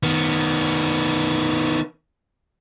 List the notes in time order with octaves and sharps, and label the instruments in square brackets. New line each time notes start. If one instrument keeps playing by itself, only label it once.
[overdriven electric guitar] D#3 B3